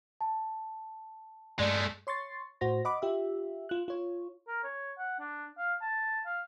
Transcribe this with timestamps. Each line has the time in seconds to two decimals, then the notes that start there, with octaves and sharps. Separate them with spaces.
0.21 A5
1.59 G2 G#3 A3 D5
2.07 C#5 C6 C#6 A6 C7
2.61 A2 F#4 C5 A#6
2.85 D#5 F#5 B5 D6
3.02 F4 G4 E5
3.69 F4 F#6
3.88 F4 C#5
4.48 A#4
4.63 C#5
4.98 F#5
5.19 D4
5.58 F5
5.82 A5
6.26 F5